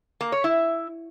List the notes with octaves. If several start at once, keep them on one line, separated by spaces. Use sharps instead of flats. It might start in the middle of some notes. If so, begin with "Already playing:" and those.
A#3
C#5
E4